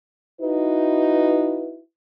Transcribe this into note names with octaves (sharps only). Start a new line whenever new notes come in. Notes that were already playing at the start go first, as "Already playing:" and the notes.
D#4 E4 F#4 B4